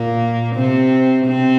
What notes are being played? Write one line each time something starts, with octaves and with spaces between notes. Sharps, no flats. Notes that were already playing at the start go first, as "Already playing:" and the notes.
Already playing: A#2 A#3
C3 C4
C3 C4